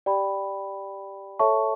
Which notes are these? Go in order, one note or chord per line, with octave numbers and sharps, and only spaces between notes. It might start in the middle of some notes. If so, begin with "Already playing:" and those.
G4 D5 G5 B5
A4 C#5 E5 A5 C#6